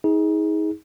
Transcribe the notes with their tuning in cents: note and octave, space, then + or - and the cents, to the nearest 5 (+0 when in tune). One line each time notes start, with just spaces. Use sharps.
D#4 +35 G#4 +0